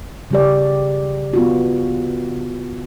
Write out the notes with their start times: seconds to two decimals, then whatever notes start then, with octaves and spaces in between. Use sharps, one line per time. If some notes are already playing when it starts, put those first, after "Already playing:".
0.31 C#3 G3 G4 D5
1.34 B3 F4 F#4